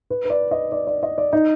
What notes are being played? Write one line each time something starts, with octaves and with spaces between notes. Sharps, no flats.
B4
B4
D5
D#5
D5
D5
D#5
D5
D#4